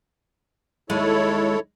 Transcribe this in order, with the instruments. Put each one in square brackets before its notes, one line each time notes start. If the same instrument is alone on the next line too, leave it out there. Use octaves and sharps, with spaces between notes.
[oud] D#2 G#3 [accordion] E4 A4 C#5